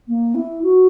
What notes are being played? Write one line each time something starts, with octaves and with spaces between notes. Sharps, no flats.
A#3
E4
F#4